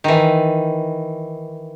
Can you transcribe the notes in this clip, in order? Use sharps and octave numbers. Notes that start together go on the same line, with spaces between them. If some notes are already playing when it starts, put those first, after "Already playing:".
D#3 E3